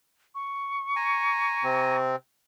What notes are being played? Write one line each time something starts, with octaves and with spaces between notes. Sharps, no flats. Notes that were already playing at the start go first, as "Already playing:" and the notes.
C#6
G#5 A#5
C3 C4